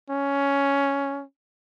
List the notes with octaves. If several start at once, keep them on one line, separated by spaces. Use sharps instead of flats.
C#4